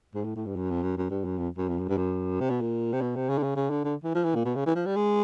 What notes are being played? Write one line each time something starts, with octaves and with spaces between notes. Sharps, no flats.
G#2
A2
A2
G2
F#2
F2
F#2
F#2
G2
F#2
F2
F#2
F2
F#2
G2
F#2
C3
B2
A#2
C3
B2
C3
C#3
D3
C#3
C#3
D3
D3
E3
F3
E3
A#2
B2
C#3
E3
F3
G3
G#3